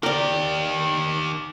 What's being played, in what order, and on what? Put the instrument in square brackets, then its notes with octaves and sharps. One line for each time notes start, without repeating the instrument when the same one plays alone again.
[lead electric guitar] D#3 G4 [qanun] A#4 D5